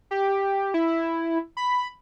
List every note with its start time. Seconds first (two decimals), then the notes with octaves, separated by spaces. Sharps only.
0.11 G4
0.74 E4
1.57 B5